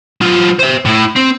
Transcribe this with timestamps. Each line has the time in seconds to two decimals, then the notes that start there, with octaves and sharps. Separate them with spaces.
0.21 F#3 F4
0.59 C5 E5
0.86 A2 E4
1.16 C4